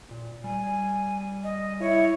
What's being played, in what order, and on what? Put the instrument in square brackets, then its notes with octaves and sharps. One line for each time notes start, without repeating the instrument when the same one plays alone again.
[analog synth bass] A#2
[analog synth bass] G3 [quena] G#5
[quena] D#5
[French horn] E4 [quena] C#5